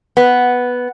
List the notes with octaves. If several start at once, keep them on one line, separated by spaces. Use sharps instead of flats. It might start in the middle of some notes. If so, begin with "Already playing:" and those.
B3